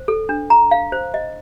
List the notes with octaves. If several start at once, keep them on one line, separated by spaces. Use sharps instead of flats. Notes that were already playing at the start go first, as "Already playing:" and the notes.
Already playing: C5
A4
D4
A#5
F5
C5
D#5